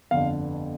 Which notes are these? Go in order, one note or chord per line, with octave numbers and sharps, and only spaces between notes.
G1 F2 D3 F5